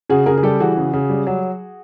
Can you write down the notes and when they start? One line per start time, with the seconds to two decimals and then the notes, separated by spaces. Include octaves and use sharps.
0.10 C#3 F#4 G#4
0.26 C#3 G#4 A#4
0.38 G#4
0.43 G3 G4 A4
0.60 E3 F#4 G#4
0.77 C#3
0.93 C#3
1.10 G3
1.27 F#3